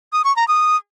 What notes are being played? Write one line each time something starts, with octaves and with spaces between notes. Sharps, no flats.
D#6
C#6
A#5
D#6